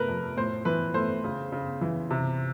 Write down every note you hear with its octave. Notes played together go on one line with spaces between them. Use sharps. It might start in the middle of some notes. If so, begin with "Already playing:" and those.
Already playing: C3 A3 A#4 B4
F2
A2 C5
E3 B4
A3 C5
C#3
C#3
E3
C3